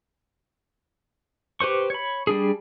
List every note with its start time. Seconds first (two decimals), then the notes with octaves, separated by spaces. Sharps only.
1.61 G4 B4 C5 C#6
1.90 C#5 B5
2.27 G3 D4 G#4